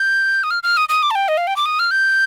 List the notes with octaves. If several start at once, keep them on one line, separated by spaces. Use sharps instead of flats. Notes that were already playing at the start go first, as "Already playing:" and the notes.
Already playing: G6
D#6
F6
F6
D#6
D#6
D6
A5
G5
D#5
F5
G5
D6
D#6
F6
G6